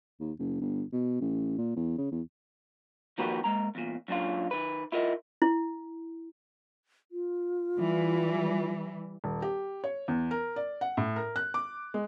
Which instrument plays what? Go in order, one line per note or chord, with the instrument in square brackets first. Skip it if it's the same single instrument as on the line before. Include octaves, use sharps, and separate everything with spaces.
[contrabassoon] D#2
F#1
G1
B2
A1
A#2
E2
C#3
E2
[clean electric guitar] D#3 F3 A#3 F#4 G4 B4
G#3 A#3 A#5
E2 A#2
F#2 A#2 D4 F4
D#3 B4
E4 F4 A#4 D#5
[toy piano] E4
[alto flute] F4
[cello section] E3 G3
[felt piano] D#1
G4
C#5
E2
A#4
D5
F#5
A2
A#4
F#6
D6
G#3